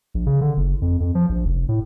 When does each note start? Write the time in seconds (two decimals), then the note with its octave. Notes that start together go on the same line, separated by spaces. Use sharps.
0.14 A#1
0.26 C#3
0.41 D3
0.57 F#1
0.82 F2
1.00 F2
1.15 F3
1.29 A#1
1.45 F1
1.69 A2